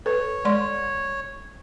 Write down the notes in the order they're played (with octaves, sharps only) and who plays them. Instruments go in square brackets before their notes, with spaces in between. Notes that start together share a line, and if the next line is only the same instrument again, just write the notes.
[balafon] A4 B4 [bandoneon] C#5
[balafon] G#3 D5 C6